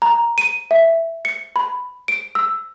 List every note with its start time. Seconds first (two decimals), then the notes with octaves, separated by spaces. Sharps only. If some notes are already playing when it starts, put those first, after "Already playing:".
0.02 A#5
0.38 D#7
0.71 E5
1.25 C#7
1.56 B5
2.08 D7
2.35 E6